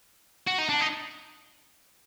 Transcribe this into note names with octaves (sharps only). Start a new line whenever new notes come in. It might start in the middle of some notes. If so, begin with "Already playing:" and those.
F#4
D#4
D4
D#4